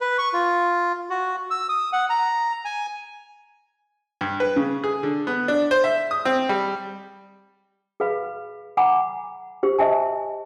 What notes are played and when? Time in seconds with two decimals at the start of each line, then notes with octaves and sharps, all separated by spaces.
0.01 B4
0.18 C#6
0.33 F4
1.10 F#4
1.51 E6
1.69 D#6
1.93 F#5
2.10 A#5
2.65 G#5
4.21 G2
4.40 B4
4.56 C#3
4.84 G#4
5.03 D3
5.27 B3
5.48 D4
5.71 C5
5.84 E5
6.11 D#6
6.25 C4
6.49 G3
8.00 G#4 B4 F5 B5
8.77 F#5 G#5 A#5 B5 D6
9.63 G4 C5
9.79 C5 D#5 E5 G#5 A5